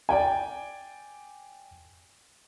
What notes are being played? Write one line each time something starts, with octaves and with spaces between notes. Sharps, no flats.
D5 G5 G#5